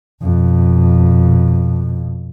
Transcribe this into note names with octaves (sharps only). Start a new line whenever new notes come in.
F2 B2